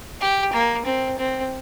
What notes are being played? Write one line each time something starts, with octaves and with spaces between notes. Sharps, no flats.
G4
A#3
C4
C4